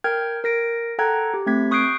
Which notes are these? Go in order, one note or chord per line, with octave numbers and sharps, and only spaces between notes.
A#4 G5 F6 G6 G#6
A#4 A#6 D7
A4 F#5 G5 A#5 F#6 G#6
G4
A3 C4 G#6 B6
C#6 D#6 F#6 G6 C7 D7